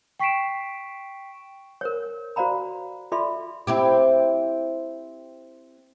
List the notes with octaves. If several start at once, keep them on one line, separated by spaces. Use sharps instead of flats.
G5 C#6 B6 C7 D7 E7
A#4 C5 C#5
F#4 C5 D5 F5 A#5 B5
F4 A4 D5 E5 B5 C6
C4 E4 G4